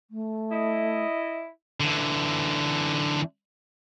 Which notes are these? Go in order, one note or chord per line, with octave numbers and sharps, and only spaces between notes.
A3
E4 D#5
D3 E3